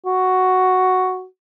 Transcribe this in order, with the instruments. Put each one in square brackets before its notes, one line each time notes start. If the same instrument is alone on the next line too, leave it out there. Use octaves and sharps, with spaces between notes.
[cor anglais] F#4